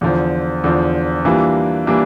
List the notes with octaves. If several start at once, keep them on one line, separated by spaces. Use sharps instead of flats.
E2 D3 F3
E2 D3 F3
E3 G3 A#3 D4 F4
E3 G3 A#3 D4 F4